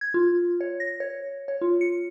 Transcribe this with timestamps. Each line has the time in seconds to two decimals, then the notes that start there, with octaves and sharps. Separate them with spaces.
0.01 G#6
0.14 F4
0.61 C#5
0.80 A#6
1.00 C#5
1.48 C#5
1.61 F4
1.81 C#7